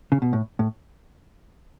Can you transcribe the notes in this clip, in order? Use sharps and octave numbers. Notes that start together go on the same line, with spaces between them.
C#3
B2
A2
A2